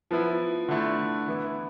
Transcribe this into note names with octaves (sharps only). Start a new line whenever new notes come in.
F3 B3 E4
D3 A3 E4
E3 B3 E4